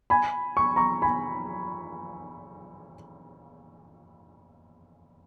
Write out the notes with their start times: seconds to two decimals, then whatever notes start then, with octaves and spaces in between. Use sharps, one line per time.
0.10 G#5 B5
0.57 C#6
0.76 A#5 C#6
1.02 G#5 B5